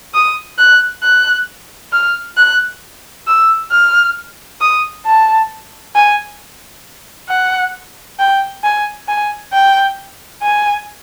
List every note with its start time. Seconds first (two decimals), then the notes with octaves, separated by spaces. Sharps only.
0.14 D#6
0.58 F#6
1.03 F#6
1.93 F6
2.37 F#6
3.27 E6
3.72 F6
4.61 D#6
5.06 A5
5.95 G#5
7.29 F#5
8.19 G5
8.64 G#5
9.08 G#5
9.53 G5
10.43 G#5